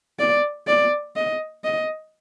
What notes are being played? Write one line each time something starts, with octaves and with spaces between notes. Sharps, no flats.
D5
D5
D#5
D#5